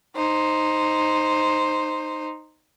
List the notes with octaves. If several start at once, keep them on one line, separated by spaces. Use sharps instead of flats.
D#4 C5